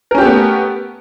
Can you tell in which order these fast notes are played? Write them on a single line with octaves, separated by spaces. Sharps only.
A#4 C#4 G4 A3 B3